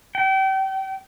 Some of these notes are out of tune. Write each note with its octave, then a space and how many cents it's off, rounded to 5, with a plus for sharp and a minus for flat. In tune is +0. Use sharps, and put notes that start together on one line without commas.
G5 -35